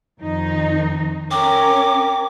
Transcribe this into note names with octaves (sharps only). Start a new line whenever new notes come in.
F2 D#3 D#4
C#4 A#4 G5 D6